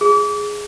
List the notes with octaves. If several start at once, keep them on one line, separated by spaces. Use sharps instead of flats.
G#4